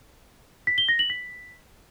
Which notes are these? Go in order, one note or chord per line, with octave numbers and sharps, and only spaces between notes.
B6
G7
A#6
F#7
B6